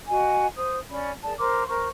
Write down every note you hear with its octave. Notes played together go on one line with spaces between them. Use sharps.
F#4 D#5 G#5
C5 D#6
C#4 D5 B5
G#4 A#4 D5 A5
A#4 C5 C6 D6
A#4 C5 C#6